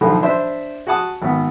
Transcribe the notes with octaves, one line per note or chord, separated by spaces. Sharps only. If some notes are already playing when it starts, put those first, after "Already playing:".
B1 D3 D#3 F3
D4 C5 E5
F#4 G#4 F#5 A5 D#6
G#1 B3